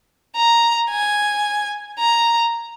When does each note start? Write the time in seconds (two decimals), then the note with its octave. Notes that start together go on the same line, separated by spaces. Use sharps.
0.36 A#5
0.90 G#5
2.00 A#5